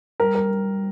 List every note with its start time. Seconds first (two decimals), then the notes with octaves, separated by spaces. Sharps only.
0.20 G3 A#4
0.35 A#4